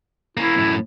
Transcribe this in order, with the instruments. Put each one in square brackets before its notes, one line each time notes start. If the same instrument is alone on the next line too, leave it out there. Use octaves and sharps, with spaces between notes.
[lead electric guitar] A#3 C#4 [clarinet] E4
[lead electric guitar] F#2 A2